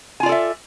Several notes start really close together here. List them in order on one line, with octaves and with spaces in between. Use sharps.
G#5 F4 D5 A4 E5